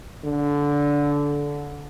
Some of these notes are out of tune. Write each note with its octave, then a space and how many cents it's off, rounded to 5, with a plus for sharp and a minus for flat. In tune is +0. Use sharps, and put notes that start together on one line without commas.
D3 -20